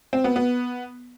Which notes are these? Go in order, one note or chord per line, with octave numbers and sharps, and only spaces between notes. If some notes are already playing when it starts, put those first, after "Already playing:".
C4
B3
B3